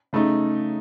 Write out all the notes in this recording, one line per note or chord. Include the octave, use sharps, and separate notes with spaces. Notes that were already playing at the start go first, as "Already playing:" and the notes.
C#3 A3 D#4